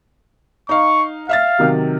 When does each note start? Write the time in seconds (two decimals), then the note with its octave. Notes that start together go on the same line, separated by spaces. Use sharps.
0.69 D#4 F5 C#6
1.29 E5 F5 F6 A6
1.58 C3 D#3 F#3